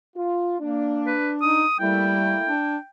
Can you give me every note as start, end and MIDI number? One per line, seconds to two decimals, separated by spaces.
0.16 0.58 65
0.60 1.16 58
0.60 1.62 62
1.07 1.32 71
1.42 1.65 63
1.42 1.77 87
1.80 2.35 55
1.80 2.51 57
1.80 2.51 58
1.80 2.51 64
1.80 2.90 79
2.48 2.77 62